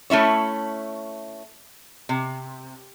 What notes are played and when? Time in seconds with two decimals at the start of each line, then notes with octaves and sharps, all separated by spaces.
0.10 A3 C#4 E4 C#5
2.09 C3